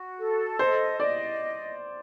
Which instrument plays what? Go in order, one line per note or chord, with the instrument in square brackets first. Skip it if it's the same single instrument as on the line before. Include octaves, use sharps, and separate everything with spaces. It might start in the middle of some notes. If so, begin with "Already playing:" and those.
Already playing: [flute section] F#4
A4
[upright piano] C5 [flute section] D#5
[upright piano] D5 [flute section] D#5